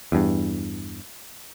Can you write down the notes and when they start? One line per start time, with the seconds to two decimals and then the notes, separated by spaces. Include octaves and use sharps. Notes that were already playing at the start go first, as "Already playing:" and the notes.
0.12 E2 G2